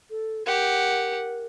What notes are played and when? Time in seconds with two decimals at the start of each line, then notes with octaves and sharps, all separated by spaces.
0.10 A4
0.46 G4 A#4 F#5